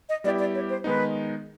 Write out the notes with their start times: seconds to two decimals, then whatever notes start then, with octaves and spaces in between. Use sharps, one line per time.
0.09 D#5
0.24 G3 B3 E4 G4 D5
0.39 D5
0.55 C#5
0.70 C5
0.84 D#3 G#3 B3 D#4 B4